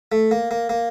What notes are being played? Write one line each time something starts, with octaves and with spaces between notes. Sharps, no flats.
A3
A#3
A#3
A#3